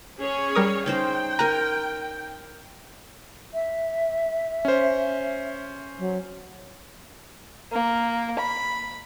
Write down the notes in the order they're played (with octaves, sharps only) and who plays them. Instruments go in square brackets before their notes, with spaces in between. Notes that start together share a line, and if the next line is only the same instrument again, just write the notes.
[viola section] C#4 G#4 C#5
[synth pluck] G3 A#4 D#6
[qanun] C#4 D#4 C5 [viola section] G5
[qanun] A#4 G#5 [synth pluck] A#5 F#6
[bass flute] E5
[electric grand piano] C#4 C5
[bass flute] F#3
[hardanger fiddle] A#3
B5